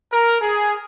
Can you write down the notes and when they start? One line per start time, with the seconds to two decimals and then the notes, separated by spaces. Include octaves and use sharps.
0.11 A#4
0.41 G#4